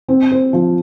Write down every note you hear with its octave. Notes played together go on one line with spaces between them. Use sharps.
C4
C5
F3